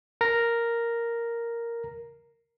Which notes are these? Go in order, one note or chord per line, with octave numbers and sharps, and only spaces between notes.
A#4 A#6